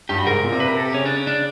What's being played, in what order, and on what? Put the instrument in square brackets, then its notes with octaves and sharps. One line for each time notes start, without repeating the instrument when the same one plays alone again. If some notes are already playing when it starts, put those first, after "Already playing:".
[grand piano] G2 [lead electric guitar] G4
[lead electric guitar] F#4
[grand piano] G#2 [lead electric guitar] A#4
[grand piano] A#2
C3
[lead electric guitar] B4
A#4
A4
G4
[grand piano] C#3 [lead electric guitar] C#4
[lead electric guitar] D4
C#4
D4